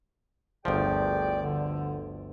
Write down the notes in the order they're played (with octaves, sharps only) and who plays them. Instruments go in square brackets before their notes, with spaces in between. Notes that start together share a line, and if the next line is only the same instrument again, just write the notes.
[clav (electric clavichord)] G1 D2 F3 [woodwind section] G#4 D5 G5
[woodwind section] D3